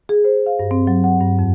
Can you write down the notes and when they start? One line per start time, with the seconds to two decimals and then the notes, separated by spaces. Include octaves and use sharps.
0.09 G#4
0.24 C5
0.46 F5
0.59 G2
0.71 C4
0.87 F#3
1.04 F#5
1.20 G2
1.39 F2